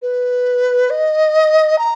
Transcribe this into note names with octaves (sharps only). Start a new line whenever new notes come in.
B4
D#5
A#5